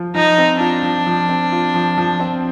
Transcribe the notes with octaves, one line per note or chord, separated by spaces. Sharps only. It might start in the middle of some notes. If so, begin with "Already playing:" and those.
Already playing: F3 F4
F3 D#4
C4
D4 F4
F3
F3
C4
F4
F3
F3
C4